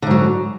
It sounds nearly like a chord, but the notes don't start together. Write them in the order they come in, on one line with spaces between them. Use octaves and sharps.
D3 G#2 F#3